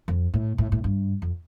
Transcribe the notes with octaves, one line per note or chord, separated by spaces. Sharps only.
F2
A2
A2
A2
G2
F2